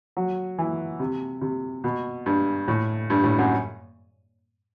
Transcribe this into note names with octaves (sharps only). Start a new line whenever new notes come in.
F#3
E3
C3
C3
B2
G2
A2
G2
A2
F#2